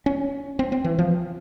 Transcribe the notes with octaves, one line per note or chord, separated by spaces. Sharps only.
C#4
C4
C4
E3
F3